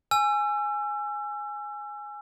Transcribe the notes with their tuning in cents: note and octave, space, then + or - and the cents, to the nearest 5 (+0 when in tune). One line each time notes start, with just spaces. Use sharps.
G#5 +0 E6 +35